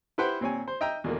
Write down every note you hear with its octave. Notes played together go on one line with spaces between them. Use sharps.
E4 G4 B4 C5 F#5 G5
A#2 C4 C#5 G#5
C5
D#5 E5 G5 A#5
E2 B2 D3 A#3